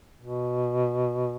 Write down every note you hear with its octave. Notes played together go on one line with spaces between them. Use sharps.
B2